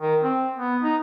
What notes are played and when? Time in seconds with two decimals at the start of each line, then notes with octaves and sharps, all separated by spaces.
0.01 D#3
0.23 C4
0.57 B3
0.82 D#4